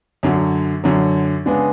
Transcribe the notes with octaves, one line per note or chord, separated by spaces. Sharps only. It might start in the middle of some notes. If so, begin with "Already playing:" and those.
F#2 D3 F#3
F#2 D3 F#3
C#3 G#3 B3 D4